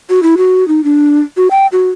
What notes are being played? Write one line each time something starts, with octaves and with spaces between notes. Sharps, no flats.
F#4
E4
F#4
D#4
D4
F#4
G5
F#4